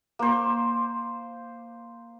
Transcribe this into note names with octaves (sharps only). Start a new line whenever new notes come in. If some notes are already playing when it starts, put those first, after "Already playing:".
A#3 C5